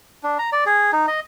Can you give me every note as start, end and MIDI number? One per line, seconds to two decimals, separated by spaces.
0.23 0.38 62
0.39 0.50 82
0.52 0.64 74
0.66 0.91 68
0.93 1.06 63
1.07 1.20 75